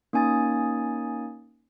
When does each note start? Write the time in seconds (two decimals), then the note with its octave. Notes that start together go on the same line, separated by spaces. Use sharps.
0.13 A#3 C#4 D#4 G#5 D#6 A6